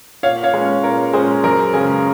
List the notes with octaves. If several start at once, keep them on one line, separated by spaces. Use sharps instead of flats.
A#2 C#5 F5
C#5 F5
G#3 C#4
A#2 A#4 C#5
G#3 C#4 G#4 C5
F#2 A#4
C#3 G#3 C#4 G#4